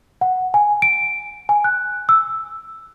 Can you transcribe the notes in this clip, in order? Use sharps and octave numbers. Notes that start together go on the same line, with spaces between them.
F#5
G#5
D7
G#5
F#6
E6